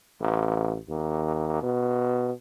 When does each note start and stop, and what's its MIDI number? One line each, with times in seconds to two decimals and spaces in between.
0.21 0.77 33
0.89 1.61 39
1.62 2.31 47